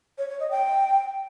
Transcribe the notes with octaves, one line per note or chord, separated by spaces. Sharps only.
C#5
C#5
D#5
G5